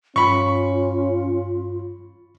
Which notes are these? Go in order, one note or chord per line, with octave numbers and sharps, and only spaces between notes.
G2 C#4 F4 B5 C#6